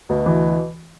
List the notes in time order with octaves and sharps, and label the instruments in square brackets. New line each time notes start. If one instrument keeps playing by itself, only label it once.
[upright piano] D2 [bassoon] B2
[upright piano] E3